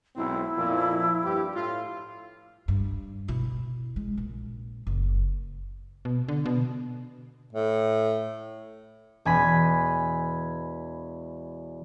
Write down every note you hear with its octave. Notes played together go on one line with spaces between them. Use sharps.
B1 G#2 C4 E4
F2 A#2 F3
G2 G4
A2 F4
G2
B2 E4
G#3
A#1
F#1
B2
D3
B2
A2
E1 G#5 B5